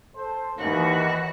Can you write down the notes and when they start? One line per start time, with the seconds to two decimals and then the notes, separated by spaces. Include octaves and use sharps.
0.15 A4 C5
0.57 D#2 E3 F#4